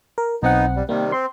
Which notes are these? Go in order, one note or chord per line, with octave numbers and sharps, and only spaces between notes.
A#4
B1 B3 C4 D#4 F#5
G3
C3 D#3 G3 A#3
C4 C6